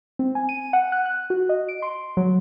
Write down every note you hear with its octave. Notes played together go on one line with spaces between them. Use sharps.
C4
G#5
D#7
F#5
F#6
F#6
F#4
D#5
D7
C6
F#3